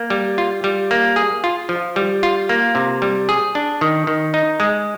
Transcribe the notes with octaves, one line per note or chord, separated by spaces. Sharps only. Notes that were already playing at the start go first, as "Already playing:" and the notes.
Already playing: A#3
G3
F4
G3
A#3
G#4
F4
F3
G3
F4
A#3
C3
G3
G#4
D4
D#3
D#3
D#4
G#3